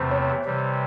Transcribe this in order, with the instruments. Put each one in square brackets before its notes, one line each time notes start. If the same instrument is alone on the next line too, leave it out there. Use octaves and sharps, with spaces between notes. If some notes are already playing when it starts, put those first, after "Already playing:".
Already playing: [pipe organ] E2 C3 E3 A3 C4 [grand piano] C5
[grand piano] C#5
[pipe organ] C3 E3 G3